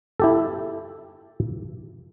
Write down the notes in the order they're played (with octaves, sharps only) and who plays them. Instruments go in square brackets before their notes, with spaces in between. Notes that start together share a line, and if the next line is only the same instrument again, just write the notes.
[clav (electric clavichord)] E4 G4 A4